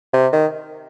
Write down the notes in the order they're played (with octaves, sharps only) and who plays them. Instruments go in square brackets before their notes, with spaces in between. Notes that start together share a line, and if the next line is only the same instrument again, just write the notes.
[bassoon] C3
D#3